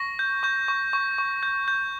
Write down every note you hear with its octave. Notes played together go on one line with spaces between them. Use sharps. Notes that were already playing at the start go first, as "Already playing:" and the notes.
Already playing: C#6 A#6
G6
C#6 G6
C#6
C#6
C#6
G6
G6